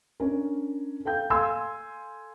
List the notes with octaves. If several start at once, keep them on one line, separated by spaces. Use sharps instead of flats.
C#4 D4 A#4
A4 F5 G5 G6
A4 F5 G#5 C6 E6